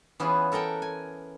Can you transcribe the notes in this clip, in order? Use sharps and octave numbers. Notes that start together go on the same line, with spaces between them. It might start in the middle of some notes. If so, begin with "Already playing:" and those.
E3 B3 C#4 F4 G#4
A4 A#4 F#5 G5 A5
G#5